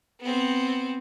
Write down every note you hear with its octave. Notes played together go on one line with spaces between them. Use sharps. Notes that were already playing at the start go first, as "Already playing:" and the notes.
B3 C4